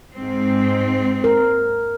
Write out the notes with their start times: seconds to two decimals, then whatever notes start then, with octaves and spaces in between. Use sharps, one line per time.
0.16 G#2 C4
1.24 A#4